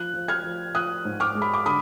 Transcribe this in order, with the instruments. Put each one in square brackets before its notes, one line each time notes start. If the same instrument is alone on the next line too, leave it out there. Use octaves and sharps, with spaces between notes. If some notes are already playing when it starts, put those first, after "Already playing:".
Already playing: [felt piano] F3 F#6
F3
F6 G#6
F3
F3 D#6 F#6
G#2
D6 F6
G#3
B5
D6
D3 B5 D#6